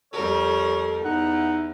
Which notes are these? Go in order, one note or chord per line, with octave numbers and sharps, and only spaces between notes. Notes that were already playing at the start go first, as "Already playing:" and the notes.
F2 G3 A4 A#4 C#5
E2 D#4 F#5